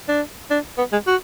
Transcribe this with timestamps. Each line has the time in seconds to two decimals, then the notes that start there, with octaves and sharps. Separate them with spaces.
0.08 D4
0.50 D4
0.78 B3
0.92 G#3
1.07 F#4